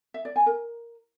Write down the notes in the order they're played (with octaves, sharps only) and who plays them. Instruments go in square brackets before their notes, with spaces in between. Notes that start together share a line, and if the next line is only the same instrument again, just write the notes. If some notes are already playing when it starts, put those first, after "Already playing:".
[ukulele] E5
D5
G#5
A#4